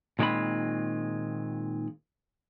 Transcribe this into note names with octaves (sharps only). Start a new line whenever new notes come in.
A#2 D#3 G#3 C4 F4 B5